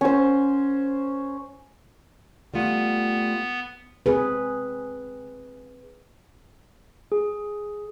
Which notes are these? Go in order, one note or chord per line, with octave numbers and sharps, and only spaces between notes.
C#4 C5
G3 A3 B3 F4
C4 G#4 B4
G#4